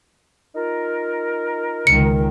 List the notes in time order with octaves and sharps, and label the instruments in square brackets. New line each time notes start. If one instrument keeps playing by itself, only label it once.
[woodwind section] D#4 F4 A#4
[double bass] C#2 D#3 [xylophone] C#7